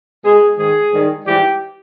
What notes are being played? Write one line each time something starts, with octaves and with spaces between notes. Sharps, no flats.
B2 G#3 G#4
G#2 D#3 G#3 G#4
G#2 D#3 G3
G#2 E3 G3 G4